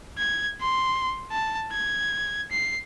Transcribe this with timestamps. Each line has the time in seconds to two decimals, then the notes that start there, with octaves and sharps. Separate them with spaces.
0.18 G#6
0.61 C6
1.31 A5
1.71 G#6
2.51 C7